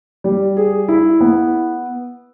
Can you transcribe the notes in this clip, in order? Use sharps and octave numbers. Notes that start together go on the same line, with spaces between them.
G3
G#4
E4
B3